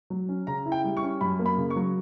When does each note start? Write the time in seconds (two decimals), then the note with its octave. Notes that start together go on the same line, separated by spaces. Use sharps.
0.10 F#3
0.29 C#4
0.47 C#3 A#5
0.66 E4
0.72 G5
0.84 G3
0.97 C#6
1.03 C#4
1.21 F#2 B5
1.39 A#3
1.46 B5
1.58 C#3
1.70 C#6
1.76 F#3